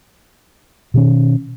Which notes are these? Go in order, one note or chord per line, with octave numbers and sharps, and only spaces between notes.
B2 D#3 C#4